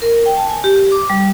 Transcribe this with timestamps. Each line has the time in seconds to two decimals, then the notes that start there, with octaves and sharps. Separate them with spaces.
0.02 A#4
0.26 G5
0.37 A5
0.50 G#5
0.64 G4
0.76 G4
0.92 D6
1.10 G3